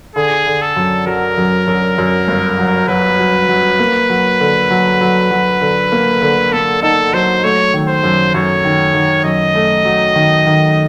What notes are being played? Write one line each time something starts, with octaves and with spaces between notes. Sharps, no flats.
D3 G#4
D3
A4
F#2
F#3 A#4
F#2
F#2
F#2
G1
F#3
F#3 B4
F#3
F#3
A#3
F#3
D3
F#3
F#3
F#3
D3
A#3
D3
A#3 A4
D#4 A4
F#3 C5
A3 C#5
D#3
C5
F#2
F#2 C#5
D#3
D#3
F#2 D#5
A3
F#3
D#3
D#3